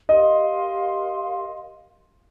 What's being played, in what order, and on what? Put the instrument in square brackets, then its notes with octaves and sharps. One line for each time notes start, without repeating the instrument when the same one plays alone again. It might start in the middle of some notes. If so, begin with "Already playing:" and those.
[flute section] G4 A#4 F5 C6 [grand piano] D#5